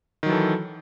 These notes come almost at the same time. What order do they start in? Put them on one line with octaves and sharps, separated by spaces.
D#3 F#3 E3 A4